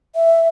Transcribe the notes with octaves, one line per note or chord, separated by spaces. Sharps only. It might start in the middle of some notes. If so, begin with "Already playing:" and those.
E5